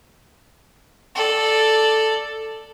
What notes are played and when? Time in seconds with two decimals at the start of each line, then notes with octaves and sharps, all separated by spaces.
1.15 A4 D5